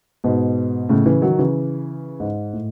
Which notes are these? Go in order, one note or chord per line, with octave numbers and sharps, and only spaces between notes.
G#2 B2
A2 C#3
C#3 E3
D#3 F#3
C#3 E3
G#2
A2